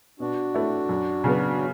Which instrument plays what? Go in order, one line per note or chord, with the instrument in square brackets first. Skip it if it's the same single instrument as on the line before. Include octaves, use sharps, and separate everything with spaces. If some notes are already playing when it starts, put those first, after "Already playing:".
[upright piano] B2 [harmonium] D4 F#4
[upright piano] A3 E4
F#2
C#3 F#3 B3